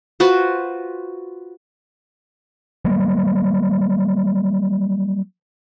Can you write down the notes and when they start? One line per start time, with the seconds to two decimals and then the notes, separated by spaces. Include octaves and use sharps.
0.20 F4 F#4 B4 C5
2.85 F#3 G3 A#3